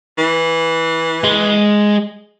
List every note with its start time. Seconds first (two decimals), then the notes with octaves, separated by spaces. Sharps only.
0.18 E3
1.24 G#3